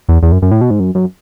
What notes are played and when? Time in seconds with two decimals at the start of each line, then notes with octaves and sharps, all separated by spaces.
0.09 E2
0.22 E2
0.32 F#2
0.42 F#2
0.51 A2
0.61 B2
0.71 G#2
0.80 F#2
0.95 F#2